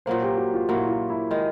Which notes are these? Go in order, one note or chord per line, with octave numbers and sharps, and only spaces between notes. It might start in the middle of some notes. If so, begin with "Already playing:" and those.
A#2 F#3 A#3 C5
G4
F#4
F4
A#2 F#3 A#3 E4
F4
E4
D#3 G#3